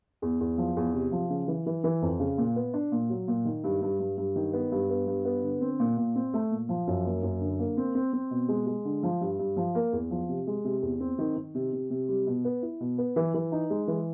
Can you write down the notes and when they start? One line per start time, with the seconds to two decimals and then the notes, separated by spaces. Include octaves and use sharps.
0.22 E2
0.40 E2
0.58 F3
0.77 E2
0.94 C3
1.12 F3
1.30 C#3
1.48 E3
1.66 E3
1.84 E3
2.02 F2
2.20 C#3
2.38 A#2
2.56 B3
2.74 D4
2.92 A#2
3.10 F#3
3.28 A#2
3.45 D#3
3.64 G2
3.82 G2
4.00 G2
4.17 G2
4.36 D#3
4.53 B3
4.72 G2
4.90 B3
5.07 G2
5.25 B3
5.43 D3
5.61 C4
5.80 A#2
5.97 A#2
6.15 C4
6.34 A3
6.51 A#2
6.69 F3
6.87 F#2
7.05 A#3
7.23 F#2
7.41 D3
7.59 A#3
7.77 C4
7.95 C4
8.13 C4
8.31 B2
8.49 G#3
8.67 G#3
8.85 D3
9.03 F3
9.21 G2
9.39 G2
9.57 F3
9.75 A#3
9.93 E2
10.11 F3
10.29 C3
10.47 G#3
10.65 C3
10.82 E2
11.00 C4
11.18 D#3
11.36 D#3
11.55 C3
11.73 C3
11.90 C3
12.09 G3
12.27 B2
12.45 B3
12.62 E4
12.80 B2
12.98 B3
13.16 E3
13.34 E3
13.52 D#4
13.70 G#3
13.88 E3